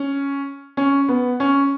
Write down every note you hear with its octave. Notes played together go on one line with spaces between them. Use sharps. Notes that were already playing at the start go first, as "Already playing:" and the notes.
Already playing: C#4
C#4
B3
C#4